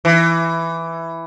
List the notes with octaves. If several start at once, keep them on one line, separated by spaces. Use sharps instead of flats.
E3